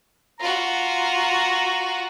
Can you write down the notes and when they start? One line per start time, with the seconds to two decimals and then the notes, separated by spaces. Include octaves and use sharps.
0.40 F4 F#4 A#5